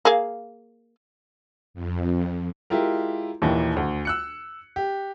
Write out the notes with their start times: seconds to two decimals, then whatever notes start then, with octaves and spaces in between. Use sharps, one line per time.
0.05 A#3 G#4 F5
1.74 F2
2.70 G#3 E4 F4 G4 A#4
3.42 D#2 A#2 D#3 E3
3.76 D2
4.05 E6 F#6 C#7
4.76 G4